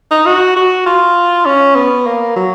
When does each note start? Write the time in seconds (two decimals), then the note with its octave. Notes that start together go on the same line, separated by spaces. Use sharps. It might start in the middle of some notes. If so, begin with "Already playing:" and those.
0.11 D#4
0.26 F#4
0.56 F#4
0.86 F4
1.46 C#4
1.75 B3
2.06 A#3
2.36 F#3